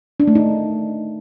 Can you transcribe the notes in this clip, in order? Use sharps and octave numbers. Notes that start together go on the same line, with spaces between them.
D4
A3
D#4